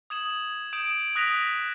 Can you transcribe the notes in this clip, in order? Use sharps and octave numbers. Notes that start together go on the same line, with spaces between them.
D#6 G#6 E7 F#7
D#6 G6 D7 E7
D#6 F#6 A#6 B6 D#7 F7